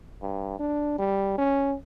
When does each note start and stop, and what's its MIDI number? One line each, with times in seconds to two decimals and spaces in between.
0.22 0.55 43
0.59 0.97 62
0.99 1.36 55
1.38 1.75 61